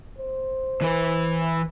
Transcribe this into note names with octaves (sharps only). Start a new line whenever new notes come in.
C5
E3 B4